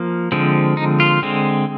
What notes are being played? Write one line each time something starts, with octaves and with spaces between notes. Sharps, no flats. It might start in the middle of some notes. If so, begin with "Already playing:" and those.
Already playing: F3 A#3
D3 F3 G#3 C4
D#4
F4
D3 G#3 C4